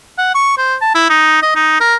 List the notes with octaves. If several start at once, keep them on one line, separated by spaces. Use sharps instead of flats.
F#5
C#6
C5
A5
E4
D#4
D#5
D#4
A#4